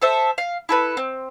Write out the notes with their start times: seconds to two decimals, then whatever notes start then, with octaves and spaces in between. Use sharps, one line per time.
0.02 A4 C5 E5
0.38 F5
0.69 E4 A4 B4
0.97 C4